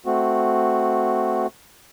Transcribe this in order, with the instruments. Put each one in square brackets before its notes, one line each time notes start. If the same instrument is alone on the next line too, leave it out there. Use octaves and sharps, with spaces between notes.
[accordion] A3 C4 F#4